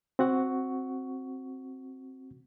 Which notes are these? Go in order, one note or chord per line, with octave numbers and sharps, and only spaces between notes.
C4 F#4 F#5 C#6